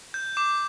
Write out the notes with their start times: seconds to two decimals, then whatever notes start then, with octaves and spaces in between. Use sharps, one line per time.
0.14 G6
0.37 D6